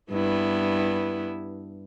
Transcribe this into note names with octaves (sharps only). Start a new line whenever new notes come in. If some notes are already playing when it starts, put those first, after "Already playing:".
G2 B3 E4